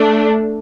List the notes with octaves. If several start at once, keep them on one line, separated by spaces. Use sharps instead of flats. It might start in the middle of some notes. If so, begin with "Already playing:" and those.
Already playing: A3 D4